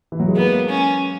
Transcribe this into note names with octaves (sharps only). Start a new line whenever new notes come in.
E3
F#3
G#3
A#3 B3
C#4